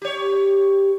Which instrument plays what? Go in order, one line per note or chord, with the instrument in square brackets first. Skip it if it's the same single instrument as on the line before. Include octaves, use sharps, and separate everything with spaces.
[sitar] G4 C#5